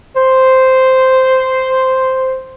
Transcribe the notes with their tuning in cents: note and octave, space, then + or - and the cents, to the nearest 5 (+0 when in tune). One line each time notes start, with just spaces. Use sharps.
C5 -5